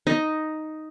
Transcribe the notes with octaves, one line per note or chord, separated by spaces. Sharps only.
D#4